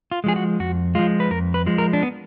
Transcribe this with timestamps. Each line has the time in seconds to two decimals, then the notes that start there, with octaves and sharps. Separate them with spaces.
0.11 F4
0.24 F3 G#3 G#4
0.36 F#4
0.60 F2 F#4
0.95 F3 G#3 F4
1.20 B4
1.31 F2 A#4
1.54 B4
1.66 F3 G#3
1.78 A#4
1.93 D4
2.03 B3